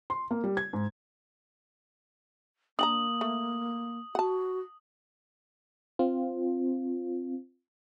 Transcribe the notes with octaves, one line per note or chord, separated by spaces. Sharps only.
C6
A#3
G3
G#6
G#2
A#3 D4 G5 A#5 D#6 F#7
A3
F#4 F#5 A5
C4 F4